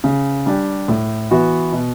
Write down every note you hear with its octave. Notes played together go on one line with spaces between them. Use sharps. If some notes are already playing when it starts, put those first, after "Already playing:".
C#3
G3 D4 G4
A2
E3 B3 F#4
B2